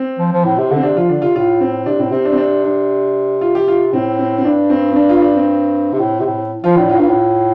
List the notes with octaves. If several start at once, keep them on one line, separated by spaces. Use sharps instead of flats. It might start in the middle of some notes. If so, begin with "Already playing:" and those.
Already playing: C4
F3
F3
A2
C3
D3
C4
C3 D4
F3 F4
D3 D4
C3 F4
A2 F4
C4
C3 D4
A2 C4
C3 C4
D4
C4
D4
D4
F4
G4
F4
A2 C4
C4
C4
G2 D4
C4
C4
D4
F4
D4
C4
C3
A2
C3
A2
F3 F4
A2 D4
A2 F4
G2
A2